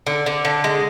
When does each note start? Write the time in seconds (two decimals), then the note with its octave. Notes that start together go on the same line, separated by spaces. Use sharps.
0.06 D3
0.26 D3
0.45 D3
0.64 G#3